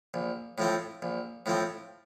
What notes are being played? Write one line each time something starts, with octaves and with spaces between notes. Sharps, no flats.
A#1
A2 F3 C4
A#1
A2 F3 C4